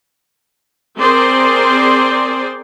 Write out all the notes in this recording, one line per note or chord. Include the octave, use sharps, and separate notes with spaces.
C4 G#4 A#4 C5 D5 C6